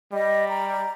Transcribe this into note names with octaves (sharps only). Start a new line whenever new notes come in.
G3 D#5
A#5